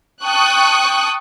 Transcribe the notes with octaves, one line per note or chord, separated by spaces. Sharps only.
G5 A5 C#6 D#6 F#6